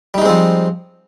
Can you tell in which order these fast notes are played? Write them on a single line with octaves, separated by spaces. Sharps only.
G3 D#4 G#3 C4 F3